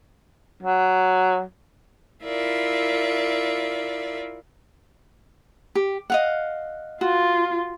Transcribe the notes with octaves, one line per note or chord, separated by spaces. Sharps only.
F#3
E4 F4 A#4 D5 E5
G4
D#5 F5 F#5
F4 F#4